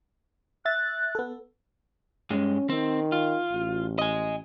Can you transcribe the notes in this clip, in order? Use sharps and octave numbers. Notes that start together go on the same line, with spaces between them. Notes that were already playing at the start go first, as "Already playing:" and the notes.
E5 F#6 A6
B3 A4
G2 G#3 C#4
D#3 C4
F4
A1
D#5 G#5